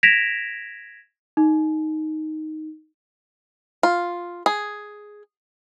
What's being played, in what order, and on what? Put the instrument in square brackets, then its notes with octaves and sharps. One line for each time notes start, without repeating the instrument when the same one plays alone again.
[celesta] G#6 A#6 B6 D7 E7 F7
D#4
[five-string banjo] F4
G#4